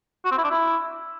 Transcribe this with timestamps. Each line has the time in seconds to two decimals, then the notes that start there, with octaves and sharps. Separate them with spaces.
0.25 F#4
0.31 C4
0.38 E4
0.44 D4
0.50 E4